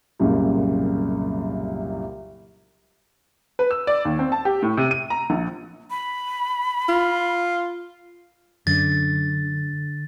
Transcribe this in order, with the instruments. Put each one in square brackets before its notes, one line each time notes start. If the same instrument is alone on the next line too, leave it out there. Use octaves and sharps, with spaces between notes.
[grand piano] C2 F#2 A#2 C#3
[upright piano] B4
E6
D5
D#2
C4
A5
G4
A2
C3
D#7
A#5
A#1
[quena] B5
[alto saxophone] F4
[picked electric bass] F#2 [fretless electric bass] D3 [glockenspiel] A6